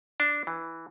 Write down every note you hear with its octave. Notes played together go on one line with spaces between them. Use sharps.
D4
E3